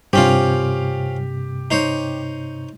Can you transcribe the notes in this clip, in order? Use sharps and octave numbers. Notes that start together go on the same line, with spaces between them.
G2 C3 C4 C#4 F4 G4
D#4 C5 C#5